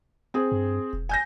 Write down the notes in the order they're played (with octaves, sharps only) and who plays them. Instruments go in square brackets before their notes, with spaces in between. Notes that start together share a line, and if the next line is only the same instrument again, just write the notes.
[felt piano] C4 G#4
[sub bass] G2
E1
[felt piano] G#5 G6 A#6